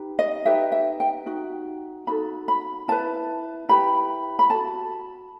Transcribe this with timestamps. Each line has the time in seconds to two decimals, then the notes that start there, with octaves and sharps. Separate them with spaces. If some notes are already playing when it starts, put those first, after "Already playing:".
Already playing: D#4 G4 B4
0.19 D#5
0.45 D#4 G4 B4 E5
0.72 E5
1.00 G5
1.26 D#4 F#4
2.07 D#4 F#4 A4 B5
2.48 B5
2.88 E4 B4 A5
3.69 E4 G4 B4 B5
4.39 B5
4.50 F#4 A4 A5